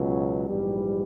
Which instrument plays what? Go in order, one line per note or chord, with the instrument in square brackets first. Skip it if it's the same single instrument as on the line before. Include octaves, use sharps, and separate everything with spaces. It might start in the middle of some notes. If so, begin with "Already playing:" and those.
Already playing: [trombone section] C#2 B2 F#3
A#1 G#2 E3 G3